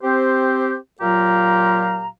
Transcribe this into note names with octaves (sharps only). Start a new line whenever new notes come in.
C4 G4 C5
A#2 F#3 F4 G4 F5 A#5